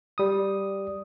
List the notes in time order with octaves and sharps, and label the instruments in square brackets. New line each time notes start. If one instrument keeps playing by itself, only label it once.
[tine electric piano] G3 D#6